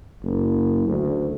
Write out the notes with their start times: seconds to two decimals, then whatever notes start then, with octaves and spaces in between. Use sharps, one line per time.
0.24 F#1
0.87 D2